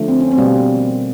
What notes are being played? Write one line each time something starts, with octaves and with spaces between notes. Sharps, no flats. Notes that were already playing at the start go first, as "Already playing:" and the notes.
Already playing: D3 F3 A3
C4
C#4
C4
B2 G3 A#3